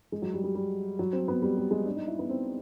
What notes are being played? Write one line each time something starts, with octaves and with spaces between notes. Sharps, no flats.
G#3
F#3
G3
G3
G3
F#3
C4
B3
G3
G3
G#3
D4
D#4
E4
B3
C4